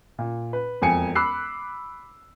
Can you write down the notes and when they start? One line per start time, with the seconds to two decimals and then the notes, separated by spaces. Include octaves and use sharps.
0.19 A#2
0.53 B4
0.82 E1 F2 G#5 C#7
1.15 B5 D6 E6 F#6 C7